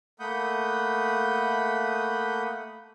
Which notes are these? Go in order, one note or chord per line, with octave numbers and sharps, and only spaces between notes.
A3 A#3 F#5 B5 D#6 G6